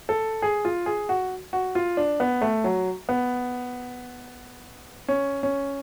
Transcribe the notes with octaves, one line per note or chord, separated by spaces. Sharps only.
A4
G#4
F4
G#4
F#4
F#4
F4
D4
B3
A3
F#3
B3
C#4
C#4